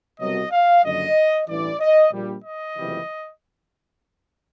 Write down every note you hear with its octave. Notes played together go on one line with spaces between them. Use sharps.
C2 B2 F#3 D#5
F5
F#1 F#2 D3 F3 D#5
A1 G2 E3 D5
D#5
A#1 A#2 G3
D#5
F#1 F2 C3 E3 G3